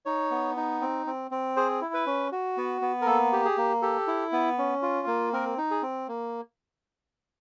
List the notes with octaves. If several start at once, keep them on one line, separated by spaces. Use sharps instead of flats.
D#4 C#5
B3
D#4
C4
C4
C4
G#4 C5
E4
B4
C#4
F#4
B3
B3
A#4
A#3 A4
G4
G#4
A#3
G4 A4
E4
B3
C#4
F4
A#3
C4 A#4
D#4
G#4
C4
A#3